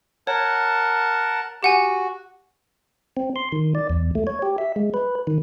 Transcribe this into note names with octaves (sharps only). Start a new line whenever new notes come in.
A#4 C#5 F#5 A5
F#4 G4 F#5 G#5
C4
C6
D#3
D5
E2
A3
C#5
G4
E5
G#3
B4
D#3